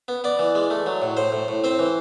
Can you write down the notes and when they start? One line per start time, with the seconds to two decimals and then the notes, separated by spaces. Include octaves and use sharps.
0.08 B3
0.24 B3 D5
0.39 E3
0.55 G#3
0.70 A3
0.86 F#3
1.02 A2
1.17 A2 C5
1.32 A2
1.48 A2
1.64 C4 C5
1.79 E3